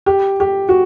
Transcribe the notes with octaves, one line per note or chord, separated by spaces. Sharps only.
G4
G4
F#4